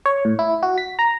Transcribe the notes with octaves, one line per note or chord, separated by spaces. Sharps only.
C#5
A2
E4
F#4
B6
A#5